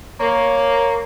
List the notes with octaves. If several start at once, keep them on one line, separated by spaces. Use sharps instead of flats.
A#3 C#5